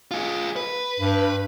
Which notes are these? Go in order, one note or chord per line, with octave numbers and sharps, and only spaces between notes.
F4 G#4
B4
G2